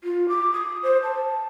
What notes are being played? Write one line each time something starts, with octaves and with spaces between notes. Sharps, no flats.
F4
D6
D#6
C5
A5